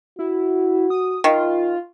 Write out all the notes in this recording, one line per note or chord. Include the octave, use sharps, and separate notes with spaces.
E4 F#4
D#6
D#3 F4